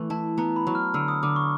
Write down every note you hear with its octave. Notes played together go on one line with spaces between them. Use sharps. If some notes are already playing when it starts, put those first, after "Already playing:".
Already playing: E3 A3
E4 A5
B3 A#5
B5
F#3
F6
D3 E6
D#6
D3 D6
C#6